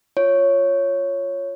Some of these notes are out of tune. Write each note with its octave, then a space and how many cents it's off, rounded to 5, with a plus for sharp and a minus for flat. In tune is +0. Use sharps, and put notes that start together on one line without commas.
F4 +0 C#5 +0